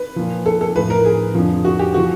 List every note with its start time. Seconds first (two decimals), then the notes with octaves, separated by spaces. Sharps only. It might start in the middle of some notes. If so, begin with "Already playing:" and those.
Already playing: B4
0.16 A#2 F3
0.46 A4
0.61 A4
0.75 A2 F3 B4
0.90 A#4
1.05 G#4
1.35 F2 D3 F3
1.65 F#4
1.79 G4
1.94 F3 F#4